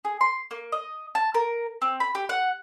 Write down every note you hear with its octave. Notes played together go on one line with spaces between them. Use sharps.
G#4
C6
A#3
D#5
A5
A#4
C4
B5
G4
F#5